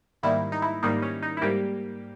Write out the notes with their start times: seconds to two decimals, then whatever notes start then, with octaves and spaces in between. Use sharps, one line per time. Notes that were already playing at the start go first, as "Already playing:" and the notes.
0.23 G#2 D#3 G3 A#3 E4
0.52 D#4
0.62 E4
0.83 G#2 D#3 G3 A#3 D#4
1.02 C#4
1.22 D#4
1.37 E4
1.41 G#2 G3 A#3 G4